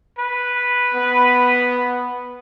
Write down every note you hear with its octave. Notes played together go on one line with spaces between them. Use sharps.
B4
B3